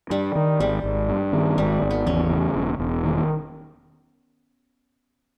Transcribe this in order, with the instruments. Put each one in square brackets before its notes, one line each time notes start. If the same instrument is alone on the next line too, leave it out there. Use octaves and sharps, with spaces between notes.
[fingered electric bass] G2 [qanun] G3
[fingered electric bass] D#3
[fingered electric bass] G#1 [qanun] G3
[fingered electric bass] G#1
G2
D#3
[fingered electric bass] G#1 [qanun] G3
[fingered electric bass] G#1
[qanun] B3
[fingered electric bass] E2 [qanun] C#4
[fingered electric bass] C#3
E1
E1
D#3